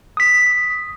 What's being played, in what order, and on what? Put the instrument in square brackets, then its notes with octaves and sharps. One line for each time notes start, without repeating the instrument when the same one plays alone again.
[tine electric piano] D#6 B6